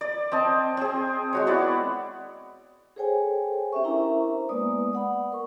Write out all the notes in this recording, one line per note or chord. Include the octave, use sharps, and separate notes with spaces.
D5
C4 D#5 A5
C4 G#4
G#3 F#4 C#5
B3 E4 D5
G#4 A4 C5 C#5 G5 G#5
C#4 G4 E5 C#6
D4 E4 A#4 C5 E5 A#5
G#3 A#3 B3 B4 D5 D#6
D5 F#5 B5
A#4 C#6